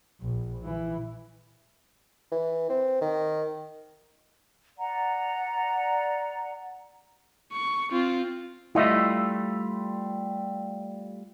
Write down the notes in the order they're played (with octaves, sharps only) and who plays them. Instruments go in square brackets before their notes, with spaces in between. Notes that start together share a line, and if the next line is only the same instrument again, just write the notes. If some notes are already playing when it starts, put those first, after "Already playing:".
[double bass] A#1
E3
[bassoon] E3
C4
D#3
[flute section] D5 F#5 A#5
[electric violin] C#6
C4 F4
[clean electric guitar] G3 A3 F4 [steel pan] E4 D#5 E5